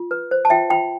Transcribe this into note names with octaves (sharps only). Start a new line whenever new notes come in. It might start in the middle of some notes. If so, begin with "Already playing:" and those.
Already playing: F4
B4
C5
A5
F4 E5 G5
F4 G5 B5